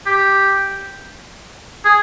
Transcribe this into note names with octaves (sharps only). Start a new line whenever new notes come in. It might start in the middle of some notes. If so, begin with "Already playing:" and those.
G4
G#4